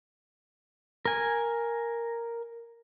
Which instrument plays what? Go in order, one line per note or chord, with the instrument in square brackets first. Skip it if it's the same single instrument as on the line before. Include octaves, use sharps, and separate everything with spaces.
[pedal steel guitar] A#4 G#5